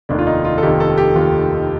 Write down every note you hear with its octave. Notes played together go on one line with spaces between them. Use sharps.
F1 D#2 D#3 D4
F4
D#4
F4
A4
F1 D#2 D#3 G4
A4
G4
F1 D#2 D#3 F4